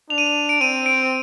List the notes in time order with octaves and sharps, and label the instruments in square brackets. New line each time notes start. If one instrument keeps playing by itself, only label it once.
[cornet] D4 [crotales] F7
[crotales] D#7
F7
D7
[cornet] C4 [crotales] D#7
[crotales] D7